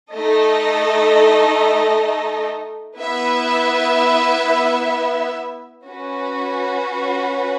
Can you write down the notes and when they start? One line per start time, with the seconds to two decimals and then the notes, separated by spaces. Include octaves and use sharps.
0.13 A3 D#4 A4 D#5
2.99 B3 E4 B4 E5
5.86 C#4 F#4 B4